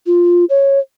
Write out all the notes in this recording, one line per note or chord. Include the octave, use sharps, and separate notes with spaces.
F4
C#5